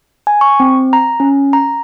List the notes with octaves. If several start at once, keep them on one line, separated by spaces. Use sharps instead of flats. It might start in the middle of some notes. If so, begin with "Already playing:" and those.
G#5
C#6
C4
A#5
C#4
A#5